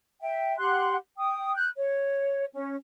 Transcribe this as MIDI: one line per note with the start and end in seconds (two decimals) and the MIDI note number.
0.21 0.56 76
0.21 0.56 79
0.59 0.95 67
0.59 0.95 78
0.59 0.95 84
0.59 0.95 90
1.17 1.55 79
1.17 1.55 87
1.55 1.68 90
1.55 1.68 91
1.76 2.45 73
2.53 2.75 61